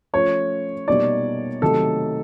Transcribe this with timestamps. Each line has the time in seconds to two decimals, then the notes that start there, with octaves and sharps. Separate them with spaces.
0.13 F3 A3 C#4 F4 C#5
0.88 B2 G3 A#3 D#4 D5
1.62 C3 D#3 F#3 A3 A4